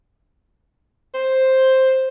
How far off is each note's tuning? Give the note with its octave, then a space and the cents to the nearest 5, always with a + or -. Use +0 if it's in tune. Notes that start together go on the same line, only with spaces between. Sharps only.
C5 +5